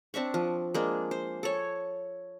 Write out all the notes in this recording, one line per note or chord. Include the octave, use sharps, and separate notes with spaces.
C4 D4 E5 C#6
F3
G#3 A#3 D4
C5
A4 C#5